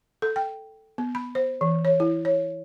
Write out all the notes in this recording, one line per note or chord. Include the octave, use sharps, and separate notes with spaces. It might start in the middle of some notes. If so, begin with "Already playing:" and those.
A4
G5
B3
B5
C5
E3
C#5
E4
C#5